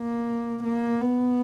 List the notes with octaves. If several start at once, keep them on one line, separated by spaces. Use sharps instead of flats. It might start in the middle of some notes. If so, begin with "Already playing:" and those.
Already playing: A#3
A#3
B3